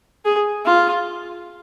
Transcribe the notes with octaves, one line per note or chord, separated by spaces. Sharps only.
G#4
F4